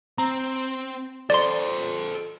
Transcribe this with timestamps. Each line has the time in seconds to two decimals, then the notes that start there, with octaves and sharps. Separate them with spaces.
0.18 C4 A#5
1.30 A4 C5 D5 C6